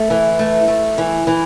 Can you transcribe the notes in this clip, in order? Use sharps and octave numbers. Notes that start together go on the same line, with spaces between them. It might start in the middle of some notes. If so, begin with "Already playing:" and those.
Already playing: A3
E3
A3
A3
E3
E3